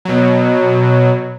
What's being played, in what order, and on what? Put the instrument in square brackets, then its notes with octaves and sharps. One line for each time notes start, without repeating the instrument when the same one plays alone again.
[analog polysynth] B2 F#3